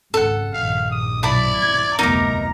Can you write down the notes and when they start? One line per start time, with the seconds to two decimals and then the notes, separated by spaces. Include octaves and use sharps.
0.14 G#1 C#2 A4 F#5
0.53 A#1 G2 D#3 F5
0.90 D#6
1.23 B1 E4 D5 A5 B5
1.58 G#6
1.99 F1 D2 B3 D#4 A#4 E5 A#5 D6